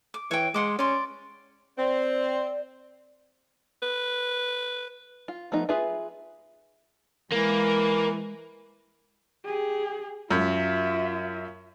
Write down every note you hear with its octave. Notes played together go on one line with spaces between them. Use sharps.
D6
E3 C#5 G5
G#3 F#5 C6 D6
C#4 D5 C6
C4 D5
B4
F4
F3 A3 B3 D#4
F4 G#4 B4 E5
E3 G#3 A#3
G4 G#4
F#2 F4 E5